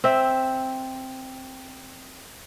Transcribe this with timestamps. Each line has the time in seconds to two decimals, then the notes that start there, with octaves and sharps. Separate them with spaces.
0.04 C4 E5